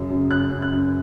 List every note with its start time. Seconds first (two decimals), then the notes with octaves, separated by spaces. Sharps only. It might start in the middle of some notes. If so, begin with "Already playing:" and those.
Already playing: F#2 C#3
0.10 F#2
0.30 F#2 F#6
0.51 F#2
0.62 F#6
0.73 F#2